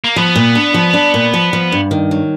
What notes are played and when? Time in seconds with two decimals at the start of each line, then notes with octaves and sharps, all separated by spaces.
0.04 A#3
0.16 F3 B3
0.35 A#2
0.55 D4
0.74 F3
0.94 D4
1.14 A#2
1.34 F3
1.53 F3
1.72 G2
1.91 D#3
2.11 F#3